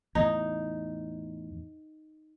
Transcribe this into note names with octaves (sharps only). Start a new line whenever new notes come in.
E2 A2 D#4